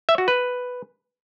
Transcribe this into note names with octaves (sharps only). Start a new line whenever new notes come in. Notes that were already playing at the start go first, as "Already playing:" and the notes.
E5
F#4
B4